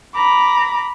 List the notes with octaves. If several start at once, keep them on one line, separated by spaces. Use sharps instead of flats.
A#5 B5 D6